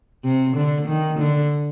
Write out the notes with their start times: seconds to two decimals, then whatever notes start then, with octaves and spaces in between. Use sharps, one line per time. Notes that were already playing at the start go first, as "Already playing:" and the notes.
0.24 C3
0.56 D3
0.88 D#3
1.19 D3